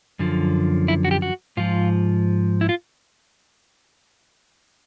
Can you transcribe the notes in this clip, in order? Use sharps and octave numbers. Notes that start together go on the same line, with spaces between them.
F#2 D3 F3
E4
F#4
G4
F#4
G#2 F3 F4
E4
F4